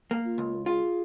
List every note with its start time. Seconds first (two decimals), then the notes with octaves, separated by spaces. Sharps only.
0.11 A#3
0.25 F4
0.38 C#2
0.66 F4 G#4